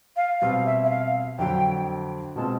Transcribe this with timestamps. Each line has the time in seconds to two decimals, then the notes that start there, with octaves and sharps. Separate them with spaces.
0.16 F5
0.41 B2 G3 C4 F5
0.66 E5
0.84 E5
0.90 F5
1.38 F2 D3 F#3 G5
2.36 B2 G#3 C4 F4 A5